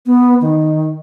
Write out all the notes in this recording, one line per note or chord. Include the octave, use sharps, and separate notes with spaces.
B3
D#3